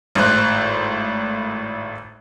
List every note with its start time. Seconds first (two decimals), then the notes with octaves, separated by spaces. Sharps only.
0.15 G#1 A2 C5 F#6